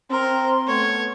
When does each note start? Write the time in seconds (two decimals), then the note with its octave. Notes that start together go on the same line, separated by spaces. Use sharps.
0.11 C4 A#4 C6
0.68 A3 B3 C#5